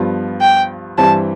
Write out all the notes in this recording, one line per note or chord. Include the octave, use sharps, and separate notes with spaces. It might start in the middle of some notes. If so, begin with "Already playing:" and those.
Already playing: G2 F3 B3 F4
G5
G2 E3 G3 C4 A5